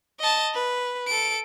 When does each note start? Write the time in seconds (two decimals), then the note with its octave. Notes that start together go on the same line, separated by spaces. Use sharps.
0.20 D#5 A5
0.54 B4
1.07 A4 D7